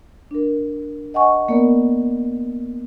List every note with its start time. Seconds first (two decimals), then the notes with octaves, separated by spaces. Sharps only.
0.31 D4 A#4
1.14 D#5 F#5 G#5 C#6
1.49 A#3 B3 A#4 D5